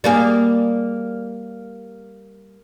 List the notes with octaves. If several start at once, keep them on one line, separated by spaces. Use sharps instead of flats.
G3 A#3 G#4